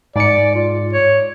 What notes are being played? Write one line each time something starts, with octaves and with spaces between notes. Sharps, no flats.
G#2 D5 C#7
F4
C#5